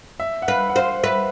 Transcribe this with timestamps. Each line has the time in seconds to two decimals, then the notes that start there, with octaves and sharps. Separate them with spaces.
0.20 E5
0.42 F#5
0.48 B4 F5
0.69 F#5
0.76 C5 F5
1.03 B4 E5